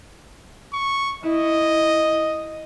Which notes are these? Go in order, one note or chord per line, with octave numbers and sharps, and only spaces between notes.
C#6
E4 D#5